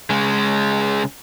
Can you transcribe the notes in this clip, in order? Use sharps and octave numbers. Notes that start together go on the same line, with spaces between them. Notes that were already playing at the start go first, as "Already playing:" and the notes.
C#3 G#3